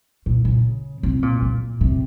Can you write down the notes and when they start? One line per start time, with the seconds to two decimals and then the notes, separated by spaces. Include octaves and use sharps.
0.26 A#2
0.45 C#3
1.03 C3
1.23 A#2
1.42 A#2
1.81 C3